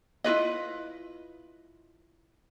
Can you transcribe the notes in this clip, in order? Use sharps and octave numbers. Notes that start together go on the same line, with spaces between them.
E4 F4 B4 D#5